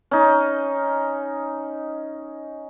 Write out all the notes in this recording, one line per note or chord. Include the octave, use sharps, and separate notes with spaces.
C#4 D#4